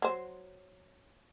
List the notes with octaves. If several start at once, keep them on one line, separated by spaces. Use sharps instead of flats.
F#3 C5